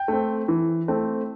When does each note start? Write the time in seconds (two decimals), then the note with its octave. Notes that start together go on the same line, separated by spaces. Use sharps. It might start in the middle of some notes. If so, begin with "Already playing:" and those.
Already playing: G5
0.08 A3 C4
0.48 E3
0.88 A3 C4